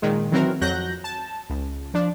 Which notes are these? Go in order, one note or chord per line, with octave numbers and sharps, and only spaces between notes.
A#2 D#3 G#3
D#3 E3 F#3 C4 F#4 A#4
F2 F#3 F#6 G6 A#6
A5
C#2
F3 D4